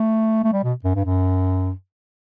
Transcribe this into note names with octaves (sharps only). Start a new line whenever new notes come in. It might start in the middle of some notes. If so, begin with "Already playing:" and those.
Already playing: A3
A3
G3
B2
F#2
G2
F#2